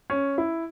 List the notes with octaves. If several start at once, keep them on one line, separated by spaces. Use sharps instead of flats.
C#4
E4